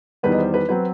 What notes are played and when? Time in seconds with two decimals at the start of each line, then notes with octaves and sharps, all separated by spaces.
0.23 E2 D#3 G3 B3 B4
0.32 D#5
0.38 C5
0.54 B4
0.69 F#3 C4 B4